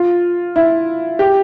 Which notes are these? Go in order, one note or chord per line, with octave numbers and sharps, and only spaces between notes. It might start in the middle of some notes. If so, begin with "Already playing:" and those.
Already playing: F4
E4
G4